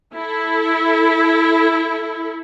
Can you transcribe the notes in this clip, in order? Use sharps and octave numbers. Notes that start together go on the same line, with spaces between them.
E4 A4